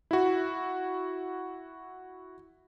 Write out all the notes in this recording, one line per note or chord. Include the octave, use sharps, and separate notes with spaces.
E4 F#4